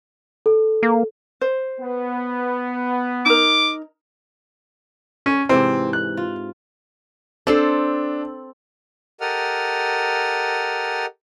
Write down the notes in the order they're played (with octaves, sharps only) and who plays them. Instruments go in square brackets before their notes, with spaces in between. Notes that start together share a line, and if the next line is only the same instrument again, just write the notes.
[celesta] A4
[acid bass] A#3
[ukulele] C5
[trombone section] B3
[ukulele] D#4 A#4 [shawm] D6
[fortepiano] C#4
[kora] G#2 C3 E3 [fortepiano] C4
[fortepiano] F#6
[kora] F4
[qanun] C4 A4 C5 [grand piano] D4
[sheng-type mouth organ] G4 A4 A#4 D#5 F#5 F6